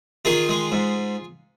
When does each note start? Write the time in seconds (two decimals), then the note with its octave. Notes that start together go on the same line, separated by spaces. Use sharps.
0.25 D#3 F4 G#4
0.49 G#3
0.72 G#2